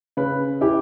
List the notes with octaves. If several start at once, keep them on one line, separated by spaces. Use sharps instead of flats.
C#3 B4
E4 G4